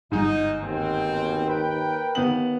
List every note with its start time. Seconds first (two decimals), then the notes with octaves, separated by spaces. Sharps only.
0.12 G1 G#2 G3 D#4
0.62 D#2 B2 C4
1.47 A#4 B4 G5
2.15 D#2 B3 F#7